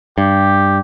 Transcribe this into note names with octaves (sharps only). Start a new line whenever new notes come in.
G2 G4